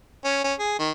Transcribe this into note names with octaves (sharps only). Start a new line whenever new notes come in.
C#4
C#4
G#4
D#3